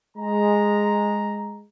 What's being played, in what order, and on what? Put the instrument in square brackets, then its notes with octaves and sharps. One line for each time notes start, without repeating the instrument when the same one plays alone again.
[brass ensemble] G#3 A#5